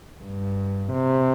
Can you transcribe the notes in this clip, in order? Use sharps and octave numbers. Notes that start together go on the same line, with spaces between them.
G2
C3